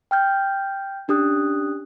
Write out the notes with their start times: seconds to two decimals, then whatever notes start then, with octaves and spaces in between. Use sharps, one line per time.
0.11 G5 F6 G6
1.08 C#4 D4 G4 D#6 F#6